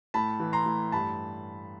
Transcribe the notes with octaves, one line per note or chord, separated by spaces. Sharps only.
A2 A5 B5
E3
A#5 C6
A2
G2 A5 B5